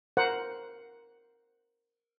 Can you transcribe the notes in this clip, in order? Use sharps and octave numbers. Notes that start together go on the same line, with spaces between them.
A#4 C5 F#5